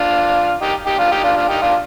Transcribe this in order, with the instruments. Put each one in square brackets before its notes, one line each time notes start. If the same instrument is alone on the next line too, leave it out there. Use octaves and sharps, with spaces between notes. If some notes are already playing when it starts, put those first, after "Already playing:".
Already playing: [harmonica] D4 F4
D#4 G4
D#4 G4
D4 F4
D#4 G4
D4 F4
D4 F4
D#4 G4
D4 F4